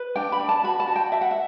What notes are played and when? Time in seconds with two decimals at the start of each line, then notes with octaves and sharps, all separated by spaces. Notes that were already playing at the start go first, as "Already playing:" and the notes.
Already playing: B4
0.16 D4 G5
0.32 B5
0.40 D4
0.49 A5
0.64 F#4 B5
0.80 A5
0.88 F#4
0.96 G5
1.12 F#4 E5
1.21 F#5
1.31 E5